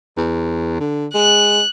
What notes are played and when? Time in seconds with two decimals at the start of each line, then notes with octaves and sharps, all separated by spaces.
0.17 E2
0.80 D3
1.14 G#3 F#6